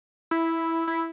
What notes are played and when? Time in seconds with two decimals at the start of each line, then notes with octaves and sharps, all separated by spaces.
0.31 E4
0.88 E4